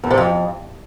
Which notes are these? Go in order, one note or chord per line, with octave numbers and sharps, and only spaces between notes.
E2
C3
F2